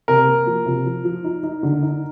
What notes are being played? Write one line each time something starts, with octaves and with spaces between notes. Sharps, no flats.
C3 A#4
A#3
F3
C3
F3
F3
D#4
D#4
D3
D#4